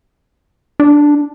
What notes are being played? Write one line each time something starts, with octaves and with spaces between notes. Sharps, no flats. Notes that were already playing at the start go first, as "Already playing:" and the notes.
D4